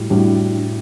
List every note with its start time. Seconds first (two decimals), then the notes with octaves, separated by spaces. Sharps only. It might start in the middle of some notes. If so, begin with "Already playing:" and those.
Already playing: A2 G3 F#4
0.10 A2 G3 D4 F#4